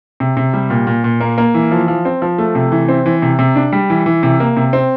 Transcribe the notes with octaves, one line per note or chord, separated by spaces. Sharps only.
C3
C3
G3
A#2
A#2
A#2
A#3
A#3
E3
F3
F3
C4
F3
A3
C3
E3
C4
E3
C3
C3
D4
G3
E3
E3
C3
A#3
C3
C4